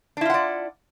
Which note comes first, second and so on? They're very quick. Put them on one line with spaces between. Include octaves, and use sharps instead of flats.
D4 E4 F4 F#5 D5